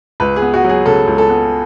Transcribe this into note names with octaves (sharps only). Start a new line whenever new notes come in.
C#2 B4
G#4
B3
F#4
F#3
G#4
C#3 A4
C#2
A4
B3